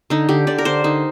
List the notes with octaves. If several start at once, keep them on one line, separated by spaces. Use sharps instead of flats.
D3 D#4
D3 G4
D3 D5
A#4
D3 C5
D3 D#4